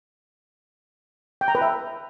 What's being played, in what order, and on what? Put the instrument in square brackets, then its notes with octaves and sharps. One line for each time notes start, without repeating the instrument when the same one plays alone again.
[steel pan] G5
A#5
B4
E5